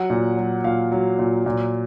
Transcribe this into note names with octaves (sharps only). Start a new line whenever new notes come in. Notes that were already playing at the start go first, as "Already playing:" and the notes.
Already playing: F#3 F#5
A#2
F#3
A#2 F5
F#3
A#2
A#2